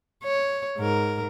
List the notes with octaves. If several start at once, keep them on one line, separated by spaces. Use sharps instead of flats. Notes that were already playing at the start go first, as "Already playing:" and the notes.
C#5
G#2 A#4